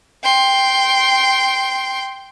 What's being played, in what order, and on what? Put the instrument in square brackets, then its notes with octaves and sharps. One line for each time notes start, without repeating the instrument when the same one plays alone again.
[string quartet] G5 C6